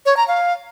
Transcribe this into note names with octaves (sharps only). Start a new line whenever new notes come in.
C#5
A#5
F5